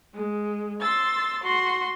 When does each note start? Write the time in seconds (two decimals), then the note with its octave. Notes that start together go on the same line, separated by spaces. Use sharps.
0.14 G#3
0.80 C6 E6 A6
1.42 F#4 C6